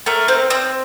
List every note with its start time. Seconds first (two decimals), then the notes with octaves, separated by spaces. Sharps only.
0.06 A3 A#4
0.28 C4
0.50 C4